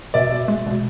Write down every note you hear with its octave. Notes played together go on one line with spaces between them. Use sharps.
B2 D5 E5
B2
G#3
B2